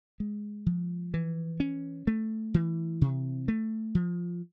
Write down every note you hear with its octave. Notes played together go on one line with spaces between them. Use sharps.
G#3
F3
E3
C#4
A3
E3
C3
A3
F3